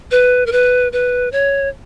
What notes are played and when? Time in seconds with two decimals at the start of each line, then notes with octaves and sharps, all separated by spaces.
0.11 B4
0.46 A#4
0.52 B4
0.93 B4
1.32 C#5